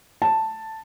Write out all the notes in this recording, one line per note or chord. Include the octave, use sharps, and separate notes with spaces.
A5